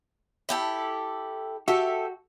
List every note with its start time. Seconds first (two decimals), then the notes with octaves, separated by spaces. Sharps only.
0.49 E4 G4 A4
1.68 F#4 G4 A4 E5